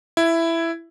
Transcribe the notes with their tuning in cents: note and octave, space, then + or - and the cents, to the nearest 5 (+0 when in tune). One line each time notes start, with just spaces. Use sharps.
E4 +10